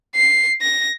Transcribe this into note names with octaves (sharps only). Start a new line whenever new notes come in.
C7
A#6